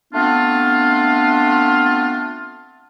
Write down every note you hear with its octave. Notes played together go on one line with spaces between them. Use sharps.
A3 B3 C4 D4 F4